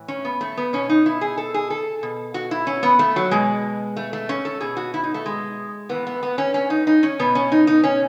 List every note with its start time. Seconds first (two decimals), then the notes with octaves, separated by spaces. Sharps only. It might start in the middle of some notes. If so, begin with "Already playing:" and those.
Already playing: A2 E3
0.08 C#4
0.25 B3
0.41 A3
0.57 B3
0.73 B2 C#4
0.89 D#4
1.06 E4
1.21 G#4
1.38 A4
1.54 G#4
1.70 A4
2.03 B2
2.34 F#4
2.51 E4
2.67 C#4
2.83 B3
2.99 A3
3.16 F#3
3.31 B2 G#3
3.97 A3
4.13 A3
4.29 C#4
4.45 A4
4.61 B2 G#4
4.77 F#4
4.94 E4
5.04 D#4
5.14 A3
5.26 G#3
5.89 A2 E3 B3
6.07 B3
6.23 B3
6.38 C#4
6.54 C#4
6.70 D#4
6.87 D#4
7.03 C#4
7.19 B2 B3
7.35 C#4
7.52 D#4
7.67 D#4
7.84 C#4